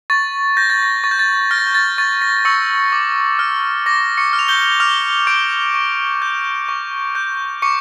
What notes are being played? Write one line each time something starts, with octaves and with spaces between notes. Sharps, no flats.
C#6 A6
G6 A#6
A6
A#6
C#6 A6
G6
A6
F6 A#6
A6
G6
A6
C#6 A6
A#6
C#6 E6 C#7
D6
F6
D6 A#6
C#6 C#7
F6
F7
G6 G7
D6 F6 F7
D6 G6 D7
C#6
G6
C#6
G6
C#6 D6 C#7